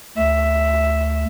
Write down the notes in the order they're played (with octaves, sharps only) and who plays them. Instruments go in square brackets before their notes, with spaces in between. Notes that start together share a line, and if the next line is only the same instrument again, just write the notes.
[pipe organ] D2 [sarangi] E5